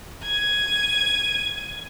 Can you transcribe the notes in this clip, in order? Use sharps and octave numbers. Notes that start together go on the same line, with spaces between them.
G#6 D#7